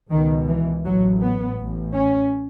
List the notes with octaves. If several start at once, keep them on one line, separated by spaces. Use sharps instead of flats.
C#2 B2 D#3
E3
A1 A2 F#3
B3
A1 A2
C#4